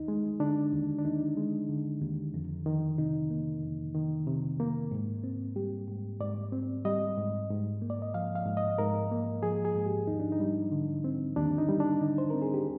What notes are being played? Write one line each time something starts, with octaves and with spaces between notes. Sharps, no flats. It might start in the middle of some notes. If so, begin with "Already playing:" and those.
Already playing: D#2 D#4
G#3
D3 D4
D#2
D4
D#2 D#4
G#3
D3
D#2
F2
D#3
C3 D#4
A#3
F2
D#3
C3
A#3
G#2
C4
G3 G4
G#2
G#2 D5
C4
G3 D#5
G#2
G#2
A#3
D5
D#5
F3 F5
F5
G#2
D#5
G#2 A#4
A#3
F3 G#4
G#4
G#2
G4
D#2 D#4
D4
D#4
G3
D3
C4
D#2 D4
D#4
G3
D4
D3 D#4
C5
C4 A#4
G#4
G4